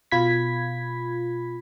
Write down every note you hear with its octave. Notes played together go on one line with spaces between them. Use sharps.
B2 F4 B5 G#6 B6